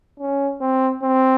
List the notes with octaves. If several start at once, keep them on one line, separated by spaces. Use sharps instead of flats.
C#4
C4
C4